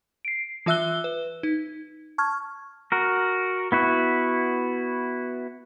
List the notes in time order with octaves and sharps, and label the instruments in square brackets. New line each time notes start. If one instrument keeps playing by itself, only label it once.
[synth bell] C7 D7
E3 F4 E5 E6 F#6 G7
B4
D#4
A5 C#6 F6 G#6
[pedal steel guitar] F#4 A#4
B3 E4 F#4